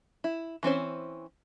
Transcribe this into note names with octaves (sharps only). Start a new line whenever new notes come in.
E4
E3 C4 C#4 C5